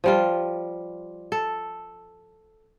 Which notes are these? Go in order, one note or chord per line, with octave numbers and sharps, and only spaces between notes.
F3 G3 F4
A4